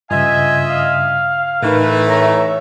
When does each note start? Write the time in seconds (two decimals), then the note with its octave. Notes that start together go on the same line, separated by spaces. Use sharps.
0.11 G2 C#3 F4 D#5 E5 G#5
0.70 F5
1.62 A2 E3 A3 D#4 A#4 B4
2.09 C#5 E5 A#5